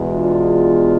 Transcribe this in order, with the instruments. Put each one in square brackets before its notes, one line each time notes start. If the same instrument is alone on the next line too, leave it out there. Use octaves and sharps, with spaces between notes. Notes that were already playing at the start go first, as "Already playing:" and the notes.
Already playing: [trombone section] E2 B2 G#3
D4 F4